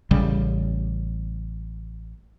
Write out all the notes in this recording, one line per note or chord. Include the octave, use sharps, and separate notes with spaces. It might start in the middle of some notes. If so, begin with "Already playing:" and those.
A1 C#3 G3